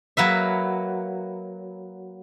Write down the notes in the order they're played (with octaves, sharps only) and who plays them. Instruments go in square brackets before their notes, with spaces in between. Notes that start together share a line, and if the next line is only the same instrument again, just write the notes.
[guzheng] F#3 A#3 B4 E5